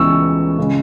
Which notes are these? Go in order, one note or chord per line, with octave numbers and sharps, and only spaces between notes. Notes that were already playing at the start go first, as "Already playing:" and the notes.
Already playing: C#2 C#3 E3 G#3 B3 C#6 E6
C#3 G#3